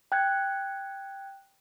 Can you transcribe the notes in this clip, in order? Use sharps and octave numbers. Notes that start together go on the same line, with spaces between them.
G5 F#6 G#6